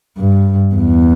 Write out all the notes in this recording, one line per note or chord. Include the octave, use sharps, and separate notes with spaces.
G2
E2